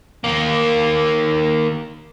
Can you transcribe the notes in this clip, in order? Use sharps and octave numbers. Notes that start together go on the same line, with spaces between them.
D#3 A#3